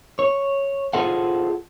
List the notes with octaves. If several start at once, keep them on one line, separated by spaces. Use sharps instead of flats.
C#5
F4 G#4 A4 C5 F5 F#5